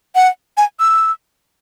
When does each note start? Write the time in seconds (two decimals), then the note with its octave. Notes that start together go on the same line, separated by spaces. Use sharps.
0.15 F#5
0.57 G#5
0.79 E6